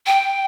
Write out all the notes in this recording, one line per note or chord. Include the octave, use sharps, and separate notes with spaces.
G5